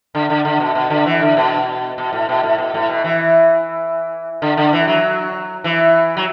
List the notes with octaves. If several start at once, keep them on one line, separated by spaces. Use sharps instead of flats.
D3
D3
D3
B2
B2
D3
E3
D3
B2
B2
A2
B2
A2
B2
A2
B2
E3
D3
D3
E3
F#3
E3
F#3